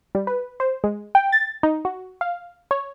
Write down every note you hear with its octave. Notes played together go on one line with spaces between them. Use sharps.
G3
B4
C5
G#3
G5
A6
D#4
F#4
F5
C#5